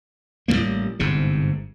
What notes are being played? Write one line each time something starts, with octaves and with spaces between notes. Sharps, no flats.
A1 E3 G3 A#3
G1 G#2 C3